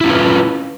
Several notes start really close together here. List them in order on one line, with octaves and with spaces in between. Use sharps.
E4 C#4 F4 B4